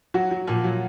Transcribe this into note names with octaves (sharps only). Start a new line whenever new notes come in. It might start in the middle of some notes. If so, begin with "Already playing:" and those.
F#3 F#4
F#3
A#2 F3 F4
F#3